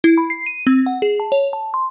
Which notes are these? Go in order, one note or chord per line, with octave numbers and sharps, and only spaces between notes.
E4
B5
C7
D#7
C4
F#5
G#4
A5
C#5
A5
C6